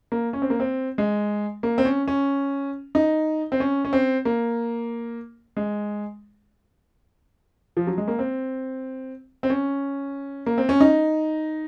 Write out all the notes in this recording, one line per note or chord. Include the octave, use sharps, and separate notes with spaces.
A#3
C#4
C4
A#3
C4
G#3
A#3
C4
C#4
C#4
D#4
C4
C#4
C#4
C4
A#3
G#3
F3
F#3
G#3
A#3
C4
C4
C#4
A#3
C4
C#4
D#4